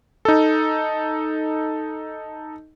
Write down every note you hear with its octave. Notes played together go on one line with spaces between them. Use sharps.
D#4 A4